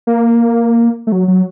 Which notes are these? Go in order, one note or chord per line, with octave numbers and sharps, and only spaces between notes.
A#3
A3
F#3
F#3